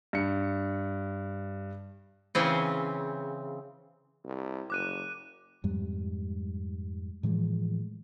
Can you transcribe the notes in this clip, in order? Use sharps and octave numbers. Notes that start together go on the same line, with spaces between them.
G2 C#7
C#3 E3 C4
C2
F#1 D6 F#6 D#7
F2 G#2 G3
A2 E3 F3 G#3